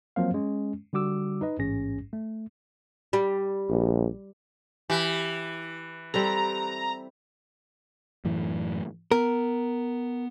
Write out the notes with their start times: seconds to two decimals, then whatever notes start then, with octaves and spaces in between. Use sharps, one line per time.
0.16 F3 F#3 A#3 C4 C5 F5
0.34 G#3 C#4
0.93 D3 G3 F#4 D6 E6
1.41 D#4 B4 D#5
1.59 A1 G#2 C#4 G#4 A#6
2.13 A3
3.13 G3
3.70 A#1
4.90 E3 G4
6.14 G3 C4 A4 A#5
8.25 F#2 A2 E3
9.11 B3 A#4